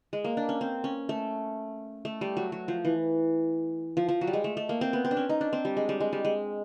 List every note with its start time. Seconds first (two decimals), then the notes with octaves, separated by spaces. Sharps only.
0.13 G#3
0.24 A#3
0.37 D4
0.49 C#4
0.61 C4
0.84 C#4
1.09 A3
2.05 A3
2.21 G3
2.37 F#3
2.52 F#3
2.68 F3
2.85 E3
3.97 F3
4.09 F3
4.21 F#3
4.27 G3
4.33 G#3
4.44 A3
4.57 A3
4.69 A#3
4.81 C4
4.93 B3
5.05 C4
5.11 D4
5.17 C#4
5.29 D#4
5.41 D4
5.53 C4
5.65 G3
5.77 G#3
5.89 G3
6.00 G#3
6.13 G3
6.25 G#3